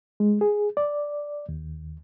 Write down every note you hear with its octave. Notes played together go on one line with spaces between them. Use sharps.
G#3
G#4
D5
D#2